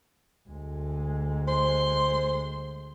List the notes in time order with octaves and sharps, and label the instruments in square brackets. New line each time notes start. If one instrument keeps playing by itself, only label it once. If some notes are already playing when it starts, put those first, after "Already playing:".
[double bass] D2 G#3
[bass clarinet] C5 [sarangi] C6